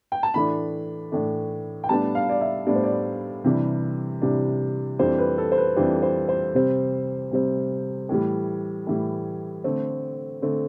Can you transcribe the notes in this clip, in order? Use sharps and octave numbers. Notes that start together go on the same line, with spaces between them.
G5
A5
A2 E3 A3 D4 B5
A2 E3 A3 D4
G5
A2 G3 B3 D4 A5
F5
D5
E5
A2 G3 B3 D4 D5
C5
D5
C3 E3 G3 D4
C3 E3 G3 D4
F2 E3 G3 D4 C5
B4
A4
C5
B4
F2 E3 G3 D4 C5
C5
C5
C3 G3 C4
C3 G3 C4
A2 E3 G3
A2 E3 G3
D3 A3 C4
D3 A3 C4